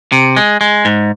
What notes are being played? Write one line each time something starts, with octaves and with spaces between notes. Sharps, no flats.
C3
G#3
G#3
G#2